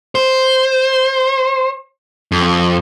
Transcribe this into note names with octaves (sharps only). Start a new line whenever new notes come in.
C5
F2